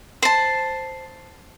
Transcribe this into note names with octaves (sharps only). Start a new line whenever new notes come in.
C5 A5